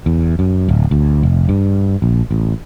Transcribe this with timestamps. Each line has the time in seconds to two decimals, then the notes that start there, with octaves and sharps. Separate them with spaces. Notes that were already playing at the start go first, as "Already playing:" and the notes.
0.06 E2
0.39 F#2
0.69 D1
0.91 D2
1.23 F1
1.49 G2
2.02 A#1
2.31 A1